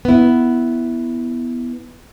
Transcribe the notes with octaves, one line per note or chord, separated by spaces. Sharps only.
B3 E4